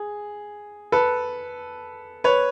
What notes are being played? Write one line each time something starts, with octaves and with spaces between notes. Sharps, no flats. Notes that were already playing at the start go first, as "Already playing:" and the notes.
Already playing: G#4
A4 B4
B4 C#5